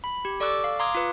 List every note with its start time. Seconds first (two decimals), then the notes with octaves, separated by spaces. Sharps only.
0.04 B5
0.25 G4
0.40 A4 D5 C#6 D6 E6 F#6
0.64 F5
0.79 F5 A#5 C6 D6 D#6 G#6
0.95 F4 B4